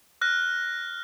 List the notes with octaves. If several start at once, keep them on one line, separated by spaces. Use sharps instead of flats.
F6 F#6 A#6